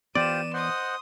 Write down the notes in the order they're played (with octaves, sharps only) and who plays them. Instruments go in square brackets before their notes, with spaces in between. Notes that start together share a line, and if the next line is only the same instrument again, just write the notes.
[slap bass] E3 B3 [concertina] F4 G4 C5 [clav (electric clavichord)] D5 [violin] D#7 E7
[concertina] C5 D#5 F#5 [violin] C6 D#6